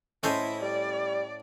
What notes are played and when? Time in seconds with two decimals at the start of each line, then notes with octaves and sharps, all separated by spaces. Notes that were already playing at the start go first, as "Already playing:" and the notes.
0.23 A2 C#4 E4 A4 C5 D#5 E5
0.62 G3 D5